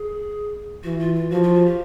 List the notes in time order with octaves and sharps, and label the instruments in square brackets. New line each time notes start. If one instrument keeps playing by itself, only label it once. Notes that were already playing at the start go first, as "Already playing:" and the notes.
Already playing: [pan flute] G#4
[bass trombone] E3 [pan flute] F#4
[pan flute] F4
F4
[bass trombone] F3 [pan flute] F#4
[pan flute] F4
F#4
G4